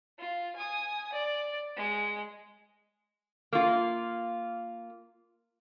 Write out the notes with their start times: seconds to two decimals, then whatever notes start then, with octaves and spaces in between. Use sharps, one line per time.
0.19 F4
0.56 G#5 D#6
1.13 D5
1.76 G#3
3.53 A#3 F4